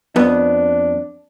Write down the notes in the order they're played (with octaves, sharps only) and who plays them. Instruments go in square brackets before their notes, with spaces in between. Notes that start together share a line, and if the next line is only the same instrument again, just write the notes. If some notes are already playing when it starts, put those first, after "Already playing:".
[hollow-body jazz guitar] F2 B3 [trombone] D4